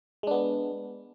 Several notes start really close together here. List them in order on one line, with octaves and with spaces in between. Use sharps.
G#3 D4 B3